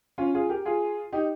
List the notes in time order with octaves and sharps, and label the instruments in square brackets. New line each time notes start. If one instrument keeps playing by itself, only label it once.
[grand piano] C#4 F4
F4 G#4
G4 A#4
F4 G#4
D#4 G4